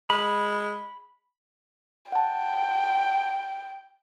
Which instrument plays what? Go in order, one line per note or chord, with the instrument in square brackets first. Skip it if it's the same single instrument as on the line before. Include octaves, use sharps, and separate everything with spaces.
[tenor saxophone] G#3 [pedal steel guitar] B5
[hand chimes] F#5 A5 [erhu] G5